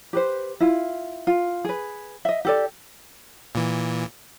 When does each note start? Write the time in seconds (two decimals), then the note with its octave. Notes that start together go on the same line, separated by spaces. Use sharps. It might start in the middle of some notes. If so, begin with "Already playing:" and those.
0.13 G4 B4 C5
0.60 E4 F4
1.27 F4
1.65 G#4 B4
2.25 D#5 E5
2.45 G4 A4 D5
3.55 A#2 E3